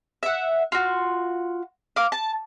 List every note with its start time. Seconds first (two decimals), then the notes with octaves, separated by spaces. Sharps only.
0.23 E5 F#5
0.72 F4 F#4
1.96 F5 D6
2.12 A5